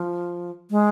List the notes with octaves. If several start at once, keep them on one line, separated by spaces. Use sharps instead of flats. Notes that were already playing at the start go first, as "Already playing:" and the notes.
Already playing: F3
G#3